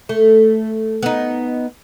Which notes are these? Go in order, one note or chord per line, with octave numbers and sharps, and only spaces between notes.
A3
B3 D#4